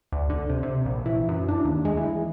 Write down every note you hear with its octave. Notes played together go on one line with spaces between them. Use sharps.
D2
D3
C3
C3
A#1
E3
F#2
D4
D#2
G#3
E3